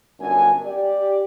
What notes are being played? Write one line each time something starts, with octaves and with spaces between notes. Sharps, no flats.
G1 F#2 D4 A#4 G#5
G4 D5